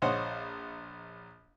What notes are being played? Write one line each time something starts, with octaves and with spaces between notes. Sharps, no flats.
A#1 C5 C#5 D#5 F#5